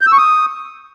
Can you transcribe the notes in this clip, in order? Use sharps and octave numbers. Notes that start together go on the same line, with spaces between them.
G6
E6
C#6
D#6